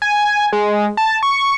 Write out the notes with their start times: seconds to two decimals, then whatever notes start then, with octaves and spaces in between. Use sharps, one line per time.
0.02 G#5
0.53 G#3
0.97 A5
1.23 C#6